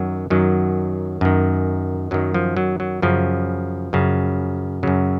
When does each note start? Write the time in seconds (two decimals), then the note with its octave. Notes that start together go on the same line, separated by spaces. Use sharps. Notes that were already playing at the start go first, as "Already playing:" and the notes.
Already playing: F#2 D#3 F#3
0.30 F#2 D#3 F#3
1.21 F#2 D#3
2.11 F#2 D#3 F#3
2.34 F3
2.57 F#3
2.80 F#3
3.02 F#2 C#3 F3
3.93 F#2 C#3
4.83 F#2 C#3 F#3